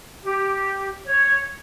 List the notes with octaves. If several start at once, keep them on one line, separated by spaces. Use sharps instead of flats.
G4
C#5